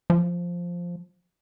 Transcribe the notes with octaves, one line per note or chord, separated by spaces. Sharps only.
F3